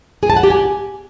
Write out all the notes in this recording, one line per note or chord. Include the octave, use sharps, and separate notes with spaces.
G#4
A5
F#5
G4
G#5